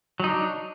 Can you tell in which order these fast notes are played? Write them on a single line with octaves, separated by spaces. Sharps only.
F#3 D#4 D4